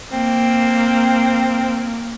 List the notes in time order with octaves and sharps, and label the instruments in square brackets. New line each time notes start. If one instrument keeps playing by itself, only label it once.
[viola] A#3 [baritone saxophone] C4